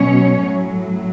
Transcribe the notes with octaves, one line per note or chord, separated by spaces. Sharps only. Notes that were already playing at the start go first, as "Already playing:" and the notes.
Already playing: B2 F#3 C#4 C#5
A2 F#3